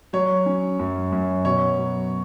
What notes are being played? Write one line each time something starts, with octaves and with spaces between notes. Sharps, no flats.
F#3 C#5
C#4
F#2
F#2
B2 C#5
F#3